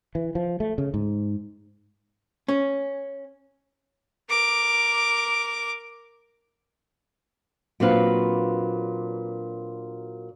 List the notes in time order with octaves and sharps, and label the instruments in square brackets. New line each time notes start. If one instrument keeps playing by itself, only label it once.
[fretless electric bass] E3
F3
A3
C#3
G#2
[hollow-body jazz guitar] C#4
[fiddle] A#4 D6
[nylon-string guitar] A#2 F#3 C4 D4 B4 F5